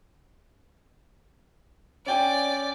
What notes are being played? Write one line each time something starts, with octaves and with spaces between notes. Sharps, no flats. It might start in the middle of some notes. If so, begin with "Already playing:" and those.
C#4 D5 G5 G#5